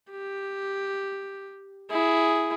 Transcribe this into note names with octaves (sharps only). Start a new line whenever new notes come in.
G4
E4 G#4